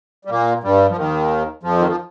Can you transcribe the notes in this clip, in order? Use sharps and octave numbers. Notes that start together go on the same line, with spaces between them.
G3
A#2 A#3
G2 G3
F3
D#2 D#3
F2 F3
D#3
F3